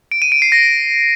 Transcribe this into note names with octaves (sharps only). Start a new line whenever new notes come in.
D7
D#7
D7
C7
A#6